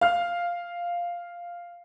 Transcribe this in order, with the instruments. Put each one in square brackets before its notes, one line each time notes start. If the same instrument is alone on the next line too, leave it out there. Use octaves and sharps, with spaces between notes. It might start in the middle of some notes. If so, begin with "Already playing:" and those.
[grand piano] F5 F6